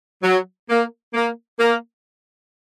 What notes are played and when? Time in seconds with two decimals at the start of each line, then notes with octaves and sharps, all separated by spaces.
0.23 F#3
0.69 A#3
1.14 A#3
1.60 A#3